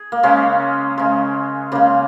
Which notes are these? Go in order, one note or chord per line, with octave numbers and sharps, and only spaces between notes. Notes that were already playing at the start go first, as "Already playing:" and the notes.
Already playing: G#4
A#3
C#3 G#3 C#4
C#3 G#3
C#3 G#3 A#3